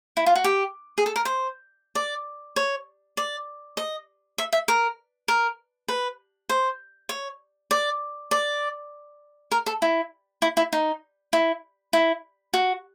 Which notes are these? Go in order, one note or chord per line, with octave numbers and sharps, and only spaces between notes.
E4
F4
F#4
G4
G#4
A4
A#4
C5
D5
C#5
D5
D#5
E5
E5
A#4
A#4
B4
C5
C#5
D5
D5
A#4
A4
E4
E4
E4
D#4
E4
E4
F#4